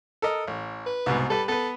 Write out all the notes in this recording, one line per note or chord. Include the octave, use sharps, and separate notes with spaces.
A4 A#4 D#5
A1
B4
C2 G#2 B2
G3 A4 B4
B3 A4 B4